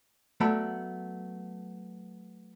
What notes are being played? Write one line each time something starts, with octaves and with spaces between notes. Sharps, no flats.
F#3 A3 B3 D5 B5